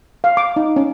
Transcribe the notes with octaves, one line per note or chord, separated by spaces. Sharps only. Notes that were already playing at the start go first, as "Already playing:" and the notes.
F5
D6
D#4
C#4